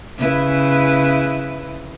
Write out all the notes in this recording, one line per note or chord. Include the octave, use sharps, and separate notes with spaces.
C#3 E4 B4